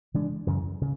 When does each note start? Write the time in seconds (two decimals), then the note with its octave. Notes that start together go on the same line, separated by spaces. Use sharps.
0.14 C#3 E3 G#3 D4
0.47 F#2 C#3 E3
0.81 C#3